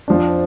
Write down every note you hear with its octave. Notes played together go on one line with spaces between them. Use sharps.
F2 F3 D4